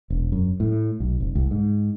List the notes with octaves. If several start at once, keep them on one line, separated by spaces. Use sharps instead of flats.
E1
F#2
A2
B1
F1
C2
G#2